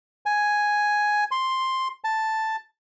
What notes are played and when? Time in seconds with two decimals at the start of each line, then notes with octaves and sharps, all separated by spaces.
0.26 G#5
1.31 C6
2.04 A5